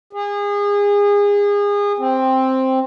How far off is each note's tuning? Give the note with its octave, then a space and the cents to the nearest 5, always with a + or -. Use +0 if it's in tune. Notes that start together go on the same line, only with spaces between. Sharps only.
G#4 -30
C4 +5